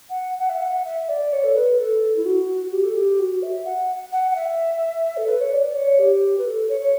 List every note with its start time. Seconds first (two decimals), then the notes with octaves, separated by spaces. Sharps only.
0.10 F#5
0.38 F#5
0.49 E5
0.61 F#5
0.85 E5
1.09 D5
1.33 C#5
1.44 A4
1.55 B4
1.79 A4
2.16 E4
2.25 F#4
2.72 G4
2.84 A4
2.94 G4
3.19 F#4
3.42 E5
3.65 F#5
4.12 F#5
4.31 F#5
4.35 E5
5.17 A4
5.28 B4
5.40 C#5
5.52 D5
5.75 C#5
5.99 G4
6.38 B4
6.45 A4
6.69 C#5
6.81 C#5